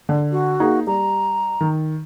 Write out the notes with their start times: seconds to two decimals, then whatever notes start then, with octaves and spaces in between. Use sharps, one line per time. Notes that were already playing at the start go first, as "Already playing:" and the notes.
0.09 D3
0.32 F#4
0.60 A#3 D#4 G#4
0.87 G3 A#5
1.61 D#3